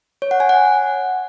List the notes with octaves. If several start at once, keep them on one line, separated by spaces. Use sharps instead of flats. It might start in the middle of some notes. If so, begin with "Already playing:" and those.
C#5
F#5
G#5
F#5